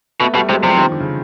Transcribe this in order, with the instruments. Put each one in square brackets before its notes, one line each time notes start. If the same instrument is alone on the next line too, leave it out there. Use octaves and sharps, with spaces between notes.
[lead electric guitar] B2 [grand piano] A3 B3
[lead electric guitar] B2 [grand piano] G3 A3
[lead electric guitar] C3 [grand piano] F#3 G#3
[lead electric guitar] C3 [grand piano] F3 G3
[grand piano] D#3 F3
D3
C#3